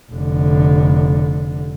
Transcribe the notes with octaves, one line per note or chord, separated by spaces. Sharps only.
F1 D3